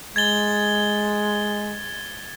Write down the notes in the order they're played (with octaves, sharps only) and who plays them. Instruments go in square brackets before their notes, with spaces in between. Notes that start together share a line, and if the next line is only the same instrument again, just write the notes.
[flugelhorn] G#3 [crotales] G#6 A6 G7